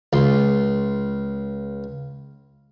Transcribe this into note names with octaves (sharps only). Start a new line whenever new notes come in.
C#2 C6